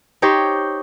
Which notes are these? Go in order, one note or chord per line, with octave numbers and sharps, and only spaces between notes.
D#4 G4 C5 C#5